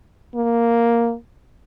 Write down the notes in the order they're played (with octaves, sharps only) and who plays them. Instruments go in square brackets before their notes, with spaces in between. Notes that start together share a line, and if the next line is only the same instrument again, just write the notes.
[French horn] A#3